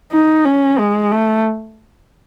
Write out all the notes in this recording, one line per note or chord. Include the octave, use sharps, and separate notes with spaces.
D#4
C#4
G#3
A3